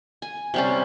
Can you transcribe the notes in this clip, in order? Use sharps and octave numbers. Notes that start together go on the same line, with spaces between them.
G#5
C3 G3 C#4